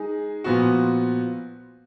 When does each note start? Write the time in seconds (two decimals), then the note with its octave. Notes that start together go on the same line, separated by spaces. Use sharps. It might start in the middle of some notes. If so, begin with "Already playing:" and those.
Already playing: G#3 D#4 G#4
0.44 A#2 F3 B3 F#4